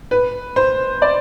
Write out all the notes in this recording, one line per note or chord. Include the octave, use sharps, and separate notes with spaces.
B4
C5
D5